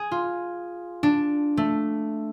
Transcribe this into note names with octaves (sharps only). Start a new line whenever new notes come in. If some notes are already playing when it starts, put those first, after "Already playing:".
Already playing: G#4
F4
D4
A3